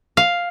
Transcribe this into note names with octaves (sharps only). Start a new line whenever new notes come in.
F5